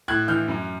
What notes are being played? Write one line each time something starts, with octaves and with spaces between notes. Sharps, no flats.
A2 F#6 G#6
E3 F6 G6
F#2